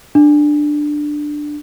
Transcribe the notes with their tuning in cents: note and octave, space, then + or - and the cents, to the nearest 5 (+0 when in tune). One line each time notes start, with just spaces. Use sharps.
D4 +10